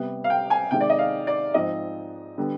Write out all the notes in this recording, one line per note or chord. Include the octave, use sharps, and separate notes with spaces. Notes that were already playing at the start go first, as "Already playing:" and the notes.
Already playing: C3 G3 B3
F5
G5
G#5
C3 D#3 G#3 G5
D5
D#5
F5
D5
G#2 F3 C4 D#5
D3 G3 B3